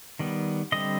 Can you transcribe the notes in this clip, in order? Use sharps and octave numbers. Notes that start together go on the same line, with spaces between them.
D#3 G3 B3
D3 G3 C4 D#5